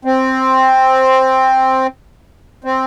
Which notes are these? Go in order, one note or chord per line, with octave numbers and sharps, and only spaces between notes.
C4
C4